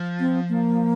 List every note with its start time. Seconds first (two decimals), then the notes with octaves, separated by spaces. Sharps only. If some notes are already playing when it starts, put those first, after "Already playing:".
Already playing: F3
0.20 C4
0.49 A#3